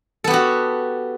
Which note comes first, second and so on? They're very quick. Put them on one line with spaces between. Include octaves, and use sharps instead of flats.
A4 B3 G4 F#4